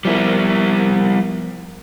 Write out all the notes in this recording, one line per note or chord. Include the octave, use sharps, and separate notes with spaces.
F3 G3 B3 E4 A#4